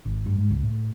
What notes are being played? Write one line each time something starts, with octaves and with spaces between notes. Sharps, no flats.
G#1
G2
G#2
C#2
A2